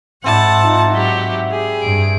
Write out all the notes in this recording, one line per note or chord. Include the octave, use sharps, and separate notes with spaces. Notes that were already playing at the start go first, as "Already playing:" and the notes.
G#2 C4 E4 D5 F#5 A5
D#4 F4
F#3 G4 F#5
G4 G#4
G2 D7